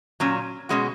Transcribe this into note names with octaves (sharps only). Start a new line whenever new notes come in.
A#2 F#3 C#4
B2 G#3 C#4 F#4